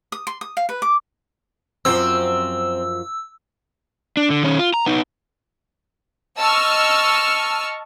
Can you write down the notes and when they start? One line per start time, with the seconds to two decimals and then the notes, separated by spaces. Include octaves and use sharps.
0.12 D#6
0.27 C6
0.41 D#6
0.57 F5
0.69 B4
0.82 D6
1.85 F#2 F3 C4 C5 E6
4.17 D4
4.30 D3
4.43 D#3 C#4
4.59 F4
4.74 A#5
4.86 B3 D#4
6.41 D#5 A5 C#6 E6 F6